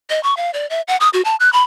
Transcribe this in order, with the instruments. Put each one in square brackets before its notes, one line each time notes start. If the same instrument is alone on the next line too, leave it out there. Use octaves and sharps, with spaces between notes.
[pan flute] D#5
C#6
F5
D5
E5
F#5
D#6
F#4
A5
F#6
B5